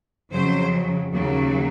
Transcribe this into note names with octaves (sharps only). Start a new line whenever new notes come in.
F2 C#3 F#3 C5
D#2 C#3 F#3